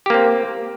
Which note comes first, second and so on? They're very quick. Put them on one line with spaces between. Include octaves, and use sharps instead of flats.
G4 A#3 C4